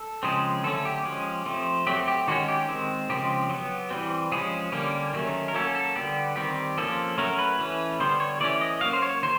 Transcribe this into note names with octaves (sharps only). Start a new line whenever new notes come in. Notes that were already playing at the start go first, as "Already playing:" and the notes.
Already playing: A4
C#3 F3 G#3 C4 G#4
D3 F#3 A3 C#4 A4
G4
F3 G#3 C#4
F3 A3 C4
F#3 A3 C4 G4
G4
D#3 G#3 C#4 F#4
G4
D#3 G#3 C4
C#3 F3 G#3 C4 G4
F#3 B3
E3 G3 C4
F3 G#3 C#4 G#4
D3 G3 A#3 C#4
D#3 F#3 A3 C#4
A#4
F#3 A#3 C#4 A4
A4
D3 G3 B3 G4
D#3 G3 C4 G4
F3 A#3 C#4 A4
F#3 A3 C#4 A#4
B4
E3 A3 C#4
D3 G3 B3 C5
C#5
E3 A3 C#4 D5
D#5
F#3 A#3 C#4 F5
C5
C#5
D#3 C5